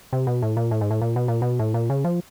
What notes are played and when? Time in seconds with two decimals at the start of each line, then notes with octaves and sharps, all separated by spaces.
0.13 C3
0.27 B2
0.42 A2
0.57 A#2
0.71 A2
0.81 G#2
0.91 A2
1.02 A#2
1.16 B2
1.28 A#2
1.42 B2
1.59 A2
1.74 A#2
1.90 C#3
2.05 F3